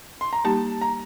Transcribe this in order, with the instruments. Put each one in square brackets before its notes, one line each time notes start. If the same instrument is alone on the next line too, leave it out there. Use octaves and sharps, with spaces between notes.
[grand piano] C6
A#5
[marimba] G3 A#3 D#4 G4 [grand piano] A5
[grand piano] A#5